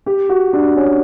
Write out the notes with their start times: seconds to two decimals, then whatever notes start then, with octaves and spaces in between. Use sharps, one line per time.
0.06 G4
0.29 F#4
0.53 D4
0.77 C#4